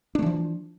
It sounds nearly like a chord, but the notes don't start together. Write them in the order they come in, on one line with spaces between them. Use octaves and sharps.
D4 A3 E3 F3